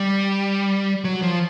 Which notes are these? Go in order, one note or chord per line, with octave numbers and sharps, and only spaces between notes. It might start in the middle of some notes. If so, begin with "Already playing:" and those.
Already playing: G3
F#3
F3